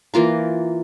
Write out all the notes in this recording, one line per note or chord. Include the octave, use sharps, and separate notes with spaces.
E3 A#3 F4 A#5